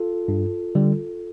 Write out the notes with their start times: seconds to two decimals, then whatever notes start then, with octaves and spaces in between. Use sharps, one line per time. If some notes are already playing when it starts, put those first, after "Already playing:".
Already playing: F4 A4
0.28 G2
0.75 D3 G3